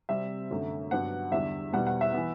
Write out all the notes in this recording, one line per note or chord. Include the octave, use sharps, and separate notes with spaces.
C3 G3 C4 E5
F#2 D3 A3
G2 F#3 B3 F#5
E2 D3 G3 E5
E2 B2 G3 B3 F#5
F#5
E5
E3 B3